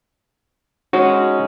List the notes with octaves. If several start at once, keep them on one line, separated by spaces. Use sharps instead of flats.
G#3 C#4 D#4 F#4